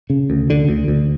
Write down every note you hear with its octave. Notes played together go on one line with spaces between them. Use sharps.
C#3
D2
D3
D2
D2